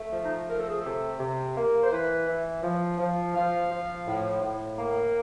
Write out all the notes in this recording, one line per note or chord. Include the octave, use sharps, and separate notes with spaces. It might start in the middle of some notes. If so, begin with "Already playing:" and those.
Already playing: A3
F3
D#4
A3 A#4
A4
G#4
A4
C3
C3
A#3
C5
E3 B4
E3
F3
F3
F3 F5
F3
A2
A2
A#3